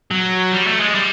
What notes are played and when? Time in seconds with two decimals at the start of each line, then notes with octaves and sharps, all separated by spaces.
0.11 F#3
0.52 G3
0.66 A3
0.80 G#3
0.95 G3